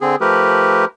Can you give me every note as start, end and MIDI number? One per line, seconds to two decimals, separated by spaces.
0.01 0.16 50
0.01 0.16 60
0.01 0.16 68
0.21 0.85 53
0.21 0.85 57
0.21 0.85 67
0.21 0.85 70
0.21 0.85 71